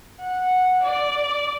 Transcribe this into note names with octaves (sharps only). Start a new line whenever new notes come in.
F#5
D5